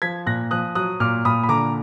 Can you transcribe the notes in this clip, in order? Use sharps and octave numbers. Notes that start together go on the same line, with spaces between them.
F3 G#6 B6
A#2 F#6 A#6
F3 D#6 F#6
F#3 D#6 F#6
A#2 D6 F6
A#2 B5 D#6
B5
D3 A#5 D6